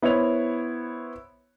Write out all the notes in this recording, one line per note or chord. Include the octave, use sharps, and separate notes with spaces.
B3 E4 C5 C#5 F7